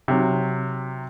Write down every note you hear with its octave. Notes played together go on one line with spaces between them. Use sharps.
C3 F#3